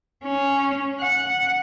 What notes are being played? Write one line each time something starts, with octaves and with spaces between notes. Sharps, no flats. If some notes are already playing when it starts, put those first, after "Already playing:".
C#4
F#5